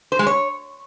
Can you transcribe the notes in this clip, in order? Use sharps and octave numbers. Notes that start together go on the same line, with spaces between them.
C5
G#3
C#5